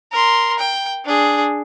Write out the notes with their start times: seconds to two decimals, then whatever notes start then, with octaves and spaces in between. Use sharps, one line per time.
0.12 A#4 C6
0.59 G5
1.05 D4 G#4